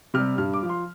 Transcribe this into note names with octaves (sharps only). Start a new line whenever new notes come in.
C3 G3 F6
G2 F6
D6
F3
C6